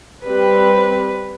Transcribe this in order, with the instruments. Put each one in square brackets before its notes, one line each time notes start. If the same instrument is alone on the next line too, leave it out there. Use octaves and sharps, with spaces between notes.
[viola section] G3 C4 B4